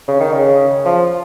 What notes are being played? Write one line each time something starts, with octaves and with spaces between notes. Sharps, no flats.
C#3
D#3
C#3
F3